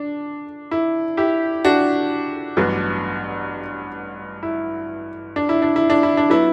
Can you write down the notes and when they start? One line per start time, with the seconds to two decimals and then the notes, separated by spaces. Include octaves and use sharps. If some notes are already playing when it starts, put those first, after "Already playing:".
Already playing: D4
0.71 E4
1.17 E4 G4
1.65 D4 F#4
2.57 A1 G2 F#3 B3
4.43 E4
5.36 D4
5.49 E4
5.62 D4
5.76 E4
5.90 D4
6.03 E4
6.17 D4
6.30 F#3 B3 E4